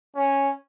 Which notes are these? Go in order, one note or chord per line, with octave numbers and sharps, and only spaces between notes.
C#4